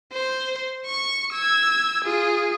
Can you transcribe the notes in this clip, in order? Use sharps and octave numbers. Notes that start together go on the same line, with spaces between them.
C5
C#6
E6 G#6
F4 G#4